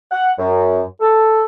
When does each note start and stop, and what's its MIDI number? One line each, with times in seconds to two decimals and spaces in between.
0.11 0.30 78
0.38 0.81 42
1.00 1.43 69